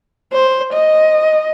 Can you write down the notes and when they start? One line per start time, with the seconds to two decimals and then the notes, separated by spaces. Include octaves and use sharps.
0.33 C5
0.73 D#5